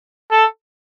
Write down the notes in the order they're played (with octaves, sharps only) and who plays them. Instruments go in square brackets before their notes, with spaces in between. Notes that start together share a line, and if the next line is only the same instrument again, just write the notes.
[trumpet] A4